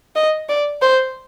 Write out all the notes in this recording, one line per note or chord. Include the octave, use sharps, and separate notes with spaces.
D#5
D5
C5